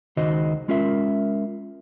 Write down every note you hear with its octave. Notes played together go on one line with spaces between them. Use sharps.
C#2 D#3 F#4 C5 D#5
G#3 C#4 F4 A#4 E5